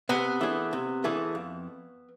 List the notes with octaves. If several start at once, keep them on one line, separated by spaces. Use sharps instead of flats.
C3 B3
E3 A3 D4 G#4
C3
E3 A3 D4 G#4
F2